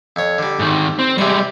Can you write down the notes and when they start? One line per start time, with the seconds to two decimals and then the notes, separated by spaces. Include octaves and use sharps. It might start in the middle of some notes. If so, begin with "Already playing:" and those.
0.16 F2 C#5
0.38 D3 G3
0.59 G#2 D#3
0.99 C4
1.18 C3 G3 G#3 C#6